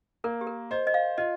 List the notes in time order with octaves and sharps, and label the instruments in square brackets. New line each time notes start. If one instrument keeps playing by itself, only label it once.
[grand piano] A#3 [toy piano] A#4
[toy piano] G4
A#4
[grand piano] C5 [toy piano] D#5
[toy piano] D#5
F5
[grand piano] F4 [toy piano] D#5